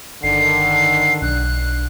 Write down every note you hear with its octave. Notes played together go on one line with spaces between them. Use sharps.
G1 D3 D#3 C7
B1 D4 F#6